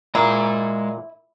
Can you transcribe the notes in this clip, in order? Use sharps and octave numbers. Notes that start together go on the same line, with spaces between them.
A#2 G#3 E4 A#5